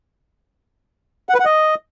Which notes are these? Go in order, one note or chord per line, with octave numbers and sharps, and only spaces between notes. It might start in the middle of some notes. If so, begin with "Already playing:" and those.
F#5
B4
F#5
D#5